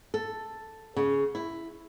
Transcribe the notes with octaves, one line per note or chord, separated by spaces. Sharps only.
A4
C#3
E4